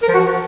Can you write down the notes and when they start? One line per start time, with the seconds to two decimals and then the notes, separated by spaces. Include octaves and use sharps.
0.02 A#4
0.08 F3
0.14 F#4
0.20 F3